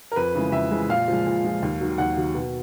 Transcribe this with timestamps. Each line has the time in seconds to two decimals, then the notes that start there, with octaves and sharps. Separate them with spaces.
0.12 A#4
0.16 F2 B4
0.35 C#3 E3 G#3
0.52 F2 E5
0.71 C#3 E3 G#3
0.89 A#2 F5
1.08 F3 G#3
1.26 A#2
1.45 F3 G#3
1.62 D#2
1.81 D#3 F#3
1.98 D#2 F#5
2.17 D#3 F#3
2.35 B2